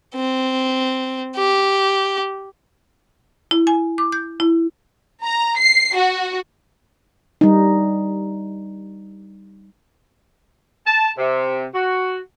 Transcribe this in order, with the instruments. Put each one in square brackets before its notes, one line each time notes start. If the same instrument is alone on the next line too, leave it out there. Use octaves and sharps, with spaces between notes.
[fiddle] C4
G4
[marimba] E4
G#5
D6
G6
E4
[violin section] A#5
C7
F#4
[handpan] G3 D#4
[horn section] A5
C3
F#4